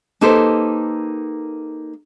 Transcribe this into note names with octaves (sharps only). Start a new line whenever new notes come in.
A#3 D#4 G4 A4 B4 C5